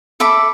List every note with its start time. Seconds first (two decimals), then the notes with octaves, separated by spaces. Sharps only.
0.20 A4 E5 B5 D6